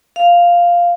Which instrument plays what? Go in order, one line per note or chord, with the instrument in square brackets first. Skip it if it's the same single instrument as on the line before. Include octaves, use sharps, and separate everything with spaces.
[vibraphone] F5